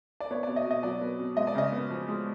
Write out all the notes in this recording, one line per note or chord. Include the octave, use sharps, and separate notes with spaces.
D5
B3 C#5
B2 D5
D#5
B2
D#5
F#3 D5
B3
B2
G#3 D#5
D5
C#3 D#5
B3
F3
G#3